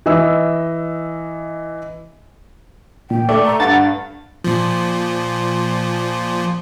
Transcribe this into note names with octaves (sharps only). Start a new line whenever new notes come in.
E3 D#5 E6
A#2 G5
A3 D5
A#5
G2 F#5 A6
A#2 F3